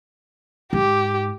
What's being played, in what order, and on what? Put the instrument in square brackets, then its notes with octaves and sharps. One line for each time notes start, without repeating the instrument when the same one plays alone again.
[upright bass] G#2 [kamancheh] G4